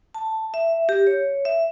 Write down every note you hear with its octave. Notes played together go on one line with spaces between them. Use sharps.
A5
E5
G4
C#5
E5